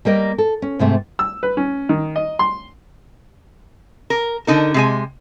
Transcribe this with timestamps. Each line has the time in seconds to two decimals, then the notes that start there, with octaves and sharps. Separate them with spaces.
0.05 G3 A#3 G4 D#5
0.38 A4
0.62 C#4
0.79 G#2 C3 A3
1.19 E6
1.43 B4
1.57 C#4
1.89 D#3
2.16 D#5
2.39 C6
4.10 A#4
4.47 D3 D#4 A#4
4.74 C3 G#3 G#5